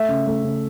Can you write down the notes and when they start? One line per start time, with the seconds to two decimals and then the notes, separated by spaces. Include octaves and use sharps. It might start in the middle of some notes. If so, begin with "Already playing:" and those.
Already playing: A3 E5
0.09 C#3
0.27 A3
0.44 C#3